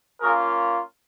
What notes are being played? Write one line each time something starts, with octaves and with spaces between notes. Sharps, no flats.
A#3 C#4 F4 G#4 A#4